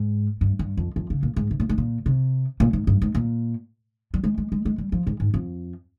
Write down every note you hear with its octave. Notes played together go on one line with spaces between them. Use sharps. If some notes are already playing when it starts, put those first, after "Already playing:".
Already playing: G#2
G2
G2
F2
F2
C#3
A#2
G#2
C3
A#2
G#2
A#2
C3
A#2
G#2
G2
G#2
A#2
G3
G#3
G#3
G#3
G#3
G3
F3
G#2
G#2
F2